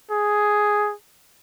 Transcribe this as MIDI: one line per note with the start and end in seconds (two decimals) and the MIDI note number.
0.11 0.93 68